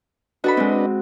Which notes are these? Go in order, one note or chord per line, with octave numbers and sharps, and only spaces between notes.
D4 F#4 A4 B4 D#5 B5
G#3 C4